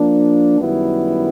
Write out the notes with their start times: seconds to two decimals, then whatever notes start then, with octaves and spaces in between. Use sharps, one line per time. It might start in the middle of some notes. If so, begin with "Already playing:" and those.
Already playing: F3 A#3 D4
0.59 F#2 D#3 G3 B3 E4